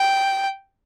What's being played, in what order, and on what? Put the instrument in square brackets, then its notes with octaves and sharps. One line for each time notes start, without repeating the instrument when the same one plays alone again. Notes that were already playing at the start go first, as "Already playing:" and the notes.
Already playing: [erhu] G5